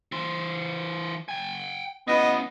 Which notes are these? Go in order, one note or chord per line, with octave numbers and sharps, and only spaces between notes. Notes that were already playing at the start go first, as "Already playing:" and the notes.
E3 C5
G5 G#5
B3 C#4 E4 D#5